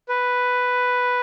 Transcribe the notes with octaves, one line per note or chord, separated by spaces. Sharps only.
B4